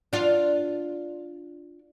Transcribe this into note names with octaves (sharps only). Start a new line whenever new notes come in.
D4 F4